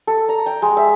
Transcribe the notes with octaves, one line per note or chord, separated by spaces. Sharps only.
A4
A#5
G5
G#3
E5